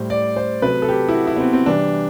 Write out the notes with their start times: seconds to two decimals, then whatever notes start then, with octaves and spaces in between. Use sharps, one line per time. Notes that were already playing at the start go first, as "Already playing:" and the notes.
Already playing: A2 G3 C5
0.10 D5
0.36 C5
0.62 C3 F#3 A3 B4
0.82 A4
0.89 G4
1.08 E4
1.14 F#4
1.27 E4
1.36 B3
1.40 C4
1.53 C4
1.66 C3 E3 G3 D4